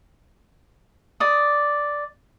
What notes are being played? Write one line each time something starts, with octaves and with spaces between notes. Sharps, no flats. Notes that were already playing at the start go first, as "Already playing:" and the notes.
D5 D#6